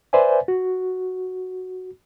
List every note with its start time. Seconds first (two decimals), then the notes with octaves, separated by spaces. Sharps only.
0.13 B4 C5 D5 E5 G#5
0.48 F#4